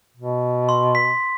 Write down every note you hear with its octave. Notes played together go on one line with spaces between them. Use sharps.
B2
C6
B6